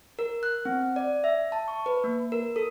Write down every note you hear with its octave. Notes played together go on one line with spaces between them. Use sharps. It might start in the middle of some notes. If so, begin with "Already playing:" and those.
A#4
F#6
C4
D5
E5
A5
C#6
B4
A#3
A#4
A4